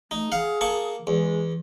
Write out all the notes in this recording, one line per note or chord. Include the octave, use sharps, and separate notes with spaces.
A3 D#4
G#4 F5 F#5
A#3 A5 C#6
E2 G#3